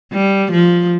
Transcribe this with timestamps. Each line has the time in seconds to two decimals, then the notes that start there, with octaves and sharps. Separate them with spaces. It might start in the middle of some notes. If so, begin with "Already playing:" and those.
0.13 G3
0.52 F3